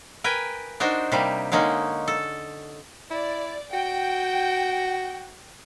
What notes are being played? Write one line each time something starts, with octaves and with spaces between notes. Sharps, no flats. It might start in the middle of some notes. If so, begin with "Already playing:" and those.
A#4 B4 G5 G#5
D4 D#4 F#4 A#4 C5
C3 G3 A#3
D3 G#3 A#3 C#4 D#4
A4
E4 D5
F#4 G5